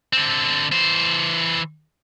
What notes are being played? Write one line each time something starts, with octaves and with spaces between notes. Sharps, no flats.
D3 C4
E3 C5